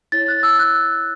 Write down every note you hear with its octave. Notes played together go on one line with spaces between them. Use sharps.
E4 C#5 A6
F#6
E6
F#6